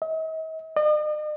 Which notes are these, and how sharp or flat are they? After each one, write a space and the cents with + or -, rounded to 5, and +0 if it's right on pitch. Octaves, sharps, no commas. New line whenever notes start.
D#5 +45
D#5 -45